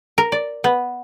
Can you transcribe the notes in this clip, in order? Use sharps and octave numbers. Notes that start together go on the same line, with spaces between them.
A#4
D5
B3